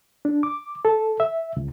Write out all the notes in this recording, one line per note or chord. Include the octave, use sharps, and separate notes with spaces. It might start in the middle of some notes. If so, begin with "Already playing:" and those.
D4
D6
A4
E5
C#2